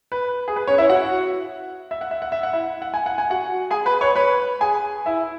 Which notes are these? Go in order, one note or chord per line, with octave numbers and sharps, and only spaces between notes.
B4
G#4
B4
C#4 C#5
E4 E5
F#4 F#5
E5
F#5
E5
F#5
E5
F#5
E4 E5
F#5
G#5
F#5
G#5
F#4 F#5
G#4 G#5
B4 B5
C#5 C#6
B4 B5
G#4 G#5
E4 E5